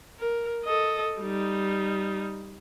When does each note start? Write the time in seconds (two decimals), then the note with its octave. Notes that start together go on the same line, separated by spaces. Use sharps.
0.19 A#4
0.64 A4 D#5
1.20 G3 D#4